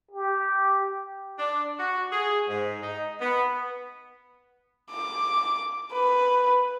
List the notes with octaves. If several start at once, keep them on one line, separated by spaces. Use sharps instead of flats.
G4
D4
F#4
G#4
G#2
D#4
B3
D6
B4